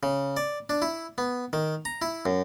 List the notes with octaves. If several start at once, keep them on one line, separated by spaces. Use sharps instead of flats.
C#3
D5
D4
E4
B3
D#3
A#5
E4
F#2